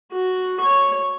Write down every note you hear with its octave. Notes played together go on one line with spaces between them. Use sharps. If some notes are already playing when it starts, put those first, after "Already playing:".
F#4
C#5 C#6